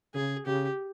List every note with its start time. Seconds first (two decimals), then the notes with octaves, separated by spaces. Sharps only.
0.14 C#3 G#4
0.46 C#3 G4